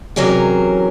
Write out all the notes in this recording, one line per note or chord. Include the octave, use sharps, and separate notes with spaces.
C3 E3 F#3 C#4 G#4 A#4